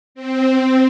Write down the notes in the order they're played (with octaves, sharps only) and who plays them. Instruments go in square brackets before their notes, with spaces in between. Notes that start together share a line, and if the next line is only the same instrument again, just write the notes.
[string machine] C4